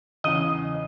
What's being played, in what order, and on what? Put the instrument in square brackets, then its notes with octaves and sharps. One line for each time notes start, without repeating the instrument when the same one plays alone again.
[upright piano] E2 C#3 [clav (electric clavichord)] D#5